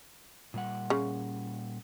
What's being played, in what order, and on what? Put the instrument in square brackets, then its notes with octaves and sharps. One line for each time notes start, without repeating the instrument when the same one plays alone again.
[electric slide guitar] A#2 G3 F#5
[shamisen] C#3